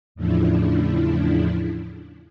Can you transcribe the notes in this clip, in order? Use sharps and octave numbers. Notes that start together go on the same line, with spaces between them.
E2 A2 C#3 F3 D4 E4